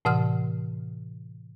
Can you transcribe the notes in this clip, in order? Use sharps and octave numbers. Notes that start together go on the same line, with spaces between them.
A2 C3 E3 F#5 D#6 F6